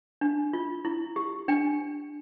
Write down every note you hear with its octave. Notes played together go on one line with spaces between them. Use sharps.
D4
F4
E4
G4
D4 G5